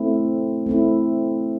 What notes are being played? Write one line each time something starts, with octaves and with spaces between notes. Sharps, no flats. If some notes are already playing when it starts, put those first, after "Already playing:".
Already playing: A3 C4 E4
A3 C4 E4